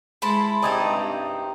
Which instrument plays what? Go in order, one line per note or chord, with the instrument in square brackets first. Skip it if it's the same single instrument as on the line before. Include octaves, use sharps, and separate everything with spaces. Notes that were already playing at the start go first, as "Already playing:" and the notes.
[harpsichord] G#3 E4 [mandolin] A5 B5 C6
[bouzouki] C4 D#4 G4 [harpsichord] E4 [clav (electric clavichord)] G#4 D5
[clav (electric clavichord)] G2